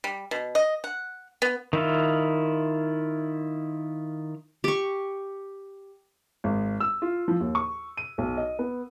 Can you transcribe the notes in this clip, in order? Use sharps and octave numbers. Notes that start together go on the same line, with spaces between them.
G3
B2
D#5
F#5
B3
D#3 E4 F4
G4 C#6
G#1
E6
F4
F3
D#2
C#6
D#7
B1
D#5
B3